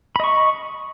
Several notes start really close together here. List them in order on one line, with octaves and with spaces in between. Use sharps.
B5 D#5 C#6